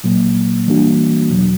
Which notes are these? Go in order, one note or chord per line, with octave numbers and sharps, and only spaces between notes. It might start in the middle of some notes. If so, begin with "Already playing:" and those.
A#2 F#3 A#3
E3 G3 A#3 D4 F#4
E2 B2 F#3